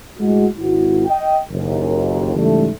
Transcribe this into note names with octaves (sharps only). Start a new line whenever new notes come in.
A2 G#3 F#4
G#1 E4 F#4
D#5 G5
F#1 D#2
G#2 C#3 E3 G3 A3